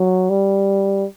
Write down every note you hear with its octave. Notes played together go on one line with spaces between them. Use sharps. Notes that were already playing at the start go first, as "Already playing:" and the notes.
Already playing: F#3
G3